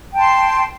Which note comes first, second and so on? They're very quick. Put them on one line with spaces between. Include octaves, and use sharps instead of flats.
G5 A5 C6